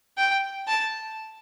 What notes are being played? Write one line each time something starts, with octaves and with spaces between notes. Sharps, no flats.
G5
A5